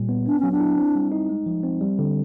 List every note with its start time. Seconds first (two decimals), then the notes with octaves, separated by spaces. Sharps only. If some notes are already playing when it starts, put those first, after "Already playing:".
Already playing: A#2 G3
0.09 B3
0.26 B3 D4
0.39 F#3 C#4
0.51 D4
0.60 E4
0.77 C4
0.95 G3
1.12 D#4
1.29 G#3
1.46 F3
1.64 C4
1.81 G3
1.99 D3